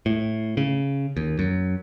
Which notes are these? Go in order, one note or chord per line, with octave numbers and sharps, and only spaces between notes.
A2
C#3
D#2
F#2